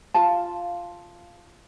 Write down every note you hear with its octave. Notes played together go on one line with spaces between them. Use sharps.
F4 F5 A5